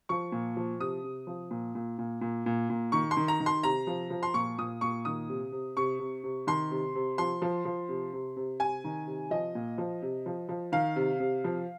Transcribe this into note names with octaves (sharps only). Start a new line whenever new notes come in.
F3 C#6
A#2
F3
C3 D#6
C3
F3
A#2
A#2
A#2
A#2
A#2
A#2
D#3 C#6
C6
D#3
A#5
D#3
C6
C3 A#5
F3
F3
C6
A#2 C#6
A#2 D#6
A#2 C#6
D#3 D#6
C3
C3
C3 C#6
C3
C3
D#3 C6
C3
C3
F3 C6
F3
F3
C3
C3
C3
C3 G#5
D#3
C3
F3 D#5
A#2
F3
C3
F3
F3
D#3 F5
C3
C3
F3